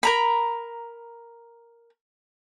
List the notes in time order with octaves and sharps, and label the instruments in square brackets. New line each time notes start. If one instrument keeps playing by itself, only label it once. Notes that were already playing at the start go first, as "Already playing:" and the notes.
[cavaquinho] A#4 A#5 B5